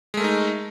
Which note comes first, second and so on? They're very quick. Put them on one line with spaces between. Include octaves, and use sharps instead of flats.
G#3 A3 A#4 D#4